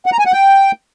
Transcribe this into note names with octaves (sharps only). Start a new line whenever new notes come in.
F#5
A#5
G#5
F#5
G5